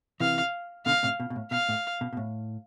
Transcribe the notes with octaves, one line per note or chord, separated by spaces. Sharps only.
C3 E3 F5
B2 D3 F5
A2 C3
B2
B2
A2
B2 F5
A2
B2
B2
A2